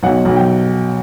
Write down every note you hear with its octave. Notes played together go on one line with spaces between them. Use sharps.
B1 F#5
B1
G5